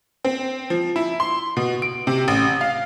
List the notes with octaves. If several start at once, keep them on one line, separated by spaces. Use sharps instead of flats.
C4
F3
E4
C6
B2
D7
C3
A1
F5